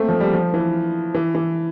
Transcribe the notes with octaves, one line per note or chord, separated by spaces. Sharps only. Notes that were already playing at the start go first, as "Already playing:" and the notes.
Already playing: A3 A#3 C4
F3
G3
F3
E3
E3
E3